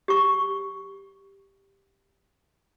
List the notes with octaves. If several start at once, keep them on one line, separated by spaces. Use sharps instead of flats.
G4 C#6